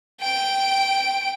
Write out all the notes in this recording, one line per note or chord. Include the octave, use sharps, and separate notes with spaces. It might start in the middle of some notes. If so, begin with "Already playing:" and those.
G5 D7